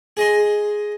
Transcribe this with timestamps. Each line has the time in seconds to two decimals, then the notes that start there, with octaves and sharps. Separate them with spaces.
0.17 G#4 D#5 C6